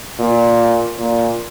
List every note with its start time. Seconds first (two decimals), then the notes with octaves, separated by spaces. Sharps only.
0.19 A#2
0.99 A#2